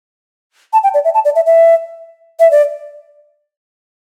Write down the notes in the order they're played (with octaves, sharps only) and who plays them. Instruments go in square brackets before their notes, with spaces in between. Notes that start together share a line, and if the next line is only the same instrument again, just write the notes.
[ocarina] A5
G5
D5
E5
A5
D5
E5
E5
E5
D5